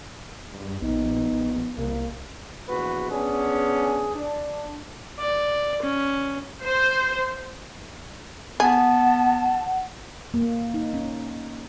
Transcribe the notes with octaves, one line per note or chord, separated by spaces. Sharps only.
G2
A#1 B3 D#4
A#1
C2 A#3
A#1 E2 F#4 B4
B3 C#4 D4 G#4
D4
D5
C#4
C5
B3 G#4 F#5 A5
A#3
D#4
C#4